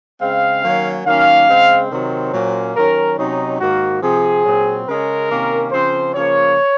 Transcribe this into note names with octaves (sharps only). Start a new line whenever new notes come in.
C#3 G#3 C4 F5
D#3 F#3 A#3 C#4
D#3 F#3 A#3 C#4 F5
C#3 G#3 C4
C3 D#3 F#3 C4 C5
A#2 F#3 A#3 C#4
D#3 F#3 C#4 A#4
C3 F#3 C#4 D#4
G#2 D#3 A#3 F#4
C3 F3 C4 G#4
A#2 F#3 C4
C#3 G#3 C#4 A#4
C3 D#3 A#3 C#4
C#3 F3 C4 C5
C#3 F3 A#3 C#5